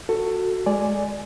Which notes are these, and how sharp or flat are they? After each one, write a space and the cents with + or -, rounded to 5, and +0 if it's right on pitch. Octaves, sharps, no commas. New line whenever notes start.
F#4 +0 A4 +20
G#3 +0 D5 +0 G#5 +0